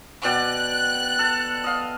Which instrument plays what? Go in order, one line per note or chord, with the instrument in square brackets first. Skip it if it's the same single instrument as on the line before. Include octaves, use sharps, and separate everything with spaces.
[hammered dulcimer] B2 D5 G5 [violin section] F#6
[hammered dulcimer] A4
D#5 F5